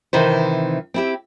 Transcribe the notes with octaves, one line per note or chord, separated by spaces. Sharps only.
C3 D#3 E3 D#4 C5
C4 E4 G4